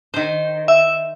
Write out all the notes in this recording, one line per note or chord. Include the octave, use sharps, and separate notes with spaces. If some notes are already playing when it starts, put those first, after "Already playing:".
D#3 C5
E5